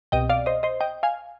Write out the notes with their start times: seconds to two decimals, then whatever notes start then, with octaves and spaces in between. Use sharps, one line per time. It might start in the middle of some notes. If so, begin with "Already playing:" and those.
0.12 C2 B2 D#5 G5
0.30 D5 F5
0.46 C5 D#5
0.63 C5 D#5
0.81 D#5 G5
1.03 F5 G#5